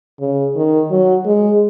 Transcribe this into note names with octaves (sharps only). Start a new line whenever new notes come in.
C#3
D#3
F#3
G#3